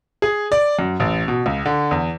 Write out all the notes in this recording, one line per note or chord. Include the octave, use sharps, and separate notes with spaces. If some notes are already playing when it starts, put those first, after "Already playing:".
G#4
D5
F#2
A1
B2
C#2
D3
E2